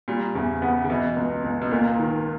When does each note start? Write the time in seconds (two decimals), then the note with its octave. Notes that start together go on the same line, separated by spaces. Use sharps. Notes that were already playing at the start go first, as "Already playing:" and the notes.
0.08 A#2 G3
0.35 E2 C#3
0.62 C#3 B3
0.84 C#3
0.90 B2 E3
1.16 C#2
1.44 C#2
1.61 B2
1.71 A#2 A#3
1.98 D#3